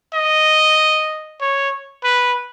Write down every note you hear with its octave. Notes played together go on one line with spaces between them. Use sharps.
D#5
C#5
B4